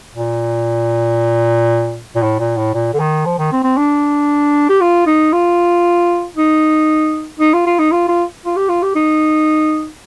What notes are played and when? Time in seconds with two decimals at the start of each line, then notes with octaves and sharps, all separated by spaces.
0.15 A#2
2.15 A#2
2.22 A2
2.39 A#2
2.57 A2
2.74 A#2
2.94 D3
2.99 D#3
3.25 F3
3.38 D#3
3.52 C4
3.64 C4
3.77 D4
4.69 G4
4.81 F4
5.06 D#4
5.33 F4
6.36 D#4
7.40 D#4
7.53 F4
7.66 F4
7.79 D#4
7.92 F4
8.08 F4
8.46 F4
8.56 G4
8.69 F4
8.83 G4
8.95 D#4